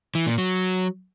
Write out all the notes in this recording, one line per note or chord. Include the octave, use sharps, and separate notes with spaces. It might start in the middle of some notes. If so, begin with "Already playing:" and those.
E3
A#2
F#3